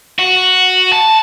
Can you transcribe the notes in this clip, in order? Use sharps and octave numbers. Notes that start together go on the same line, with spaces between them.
F#4
A5